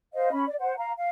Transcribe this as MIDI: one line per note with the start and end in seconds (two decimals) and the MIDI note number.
0.14 0.31 72
0.14 0.31 75
0.14 0.31 77
0.32 0.45 61
0.32 0.45 83
0.47 0.55 74
0.60 0.76 72
0.60 0.76 78
0.77 0.92 77
0.77 0.92 82
0.97 1.10 77